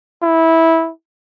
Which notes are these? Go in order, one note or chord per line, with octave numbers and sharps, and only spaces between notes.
E4